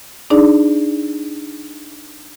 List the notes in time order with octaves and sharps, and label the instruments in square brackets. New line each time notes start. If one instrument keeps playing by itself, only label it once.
[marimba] D4 D#4 G#4 D5